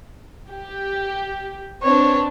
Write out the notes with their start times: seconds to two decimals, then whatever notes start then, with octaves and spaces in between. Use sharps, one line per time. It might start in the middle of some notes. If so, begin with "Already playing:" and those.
0.50 G4
1.82 C4 D4 B4 C#5